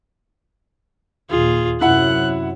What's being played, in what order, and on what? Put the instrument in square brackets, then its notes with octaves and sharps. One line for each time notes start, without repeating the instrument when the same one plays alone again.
[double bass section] D#2 A#2 [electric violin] F4 G#4
[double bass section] F#2 C3 [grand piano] E4 F#5 [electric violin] F#6